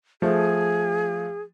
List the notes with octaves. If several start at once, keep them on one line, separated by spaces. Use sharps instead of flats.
F3 A3 G#4